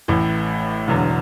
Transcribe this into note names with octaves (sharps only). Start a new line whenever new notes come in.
A1 A2 E3
E1 E2 D3 F#3